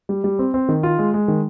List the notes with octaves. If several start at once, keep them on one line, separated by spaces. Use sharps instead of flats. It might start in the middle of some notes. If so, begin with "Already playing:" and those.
G3
G3
C4
C4
D#3
F4
G#3
G#3
D#3